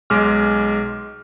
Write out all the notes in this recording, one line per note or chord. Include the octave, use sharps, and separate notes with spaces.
B1 G#3 D6 F6